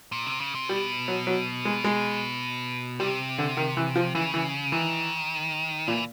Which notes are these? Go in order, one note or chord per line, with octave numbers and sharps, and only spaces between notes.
A#2
C3
C#3
C3
B2 G3
F#3
F#3
G#3
G#3
C3 G3
D3
D#3
E3
F3
C#3 E3
E3
D#3 E3
A#2 E3